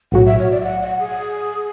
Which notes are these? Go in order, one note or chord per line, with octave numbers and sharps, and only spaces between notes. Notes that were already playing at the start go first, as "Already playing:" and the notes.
B1 A2 F#3 F#5
E5
C#5
D5
E5
F#5
F#5
G#4